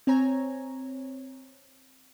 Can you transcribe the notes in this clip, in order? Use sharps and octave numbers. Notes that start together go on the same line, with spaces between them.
C4 C#5 G#5 A#5